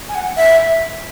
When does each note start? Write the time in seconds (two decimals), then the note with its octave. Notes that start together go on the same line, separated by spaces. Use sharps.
0.09 G#5
0.15 F#5
0.37 E5